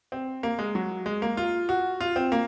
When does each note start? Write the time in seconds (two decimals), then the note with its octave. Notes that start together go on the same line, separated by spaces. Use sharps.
0.12 C4
0.43 A#3
0.59 G#3
0.75 F#3
1.06 G#3
1.22 A#3
1.37 F4
1.69 F#4
2.00 F4
2.16 C4
2.32 A#3